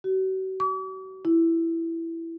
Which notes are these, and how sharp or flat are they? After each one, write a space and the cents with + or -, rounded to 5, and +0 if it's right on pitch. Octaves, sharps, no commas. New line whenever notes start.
F#4 +40
D6 -45
E4 +5